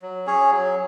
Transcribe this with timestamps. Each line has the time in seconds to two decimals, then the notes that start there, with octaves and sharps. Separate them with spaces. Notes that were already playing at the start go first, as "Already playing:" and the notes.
0.02 F#3
0.26 C#4 G#4 C#5
0.51 F#3